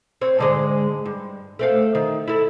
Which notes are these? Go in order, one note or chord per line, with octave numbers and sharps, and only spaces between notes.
C4 C#5
G#2 D3 G#3
G2
A3 C4 F5
D#3
E4 A4